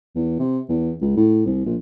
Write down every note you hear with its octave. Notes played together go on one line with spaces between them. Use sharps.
E2
C3
E2
C#2
A2
C2
A#1